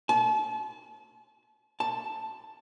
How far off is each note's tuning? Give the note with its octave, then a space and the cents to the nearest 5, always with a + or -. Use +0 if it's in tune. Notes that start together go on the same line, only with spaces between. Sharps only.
A5 -35
A5 +5